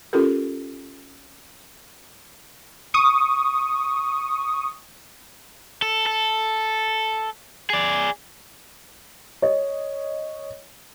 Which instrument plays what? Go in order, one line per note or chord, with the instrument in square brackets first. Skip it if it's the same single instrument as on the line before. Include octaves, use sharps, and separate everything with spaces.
[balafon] C#4 F4 G4 A4 A#4
[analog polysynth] C#6 D#6
[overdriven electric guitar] A4
A4
G#4 D5
[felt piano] C#5 D#5